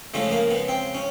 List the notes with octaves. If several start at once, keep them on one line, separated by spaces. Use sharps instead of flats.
C#3 F3 G#3 A3
A#3
B3
C4
C#4